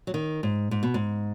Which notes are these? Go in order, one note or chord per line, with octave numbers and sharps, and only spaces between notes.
F#3
D#3
G#2
G#2
B2
G#2